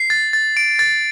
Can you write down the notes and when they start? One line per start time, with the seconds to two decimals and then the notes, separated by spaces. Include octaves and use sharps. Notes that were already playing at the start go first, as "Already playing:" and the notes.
Already playing: C7
0.10 A6
0.33 A6
0.57 D7
0.79 A6